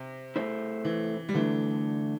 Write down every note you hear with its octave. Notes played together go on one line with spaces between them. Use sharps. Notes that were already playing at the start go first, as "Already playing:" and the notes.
Already playing: C3
A3 E4 C5
E3
G3
D3 E3 A3 D4